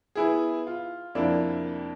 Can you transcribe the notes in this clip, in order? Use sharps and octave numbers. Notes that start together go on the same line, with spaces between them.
B3 E4 G#4
F4
F2 C3 A#3 D4 E4